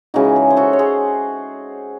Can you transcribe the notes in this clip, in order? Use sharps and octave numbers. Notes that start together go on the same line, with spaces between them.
C#3 E3 G#3 D#4 F#4
G#4
C5
F#4 A4
C#5
G#4 C5